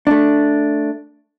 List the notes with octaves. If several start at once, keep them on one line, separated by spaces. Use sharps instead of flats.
A3 D4